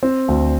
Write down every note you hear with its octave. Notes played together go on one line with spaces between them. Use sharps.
C4
D2